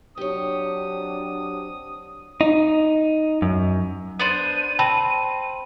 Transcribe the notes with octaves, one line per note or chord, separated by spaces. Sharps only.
F#3 C4 D4 G4 C#5 D#6
D#4
F#2
B3 D4 C5 D#7
C4 G5 A5 B5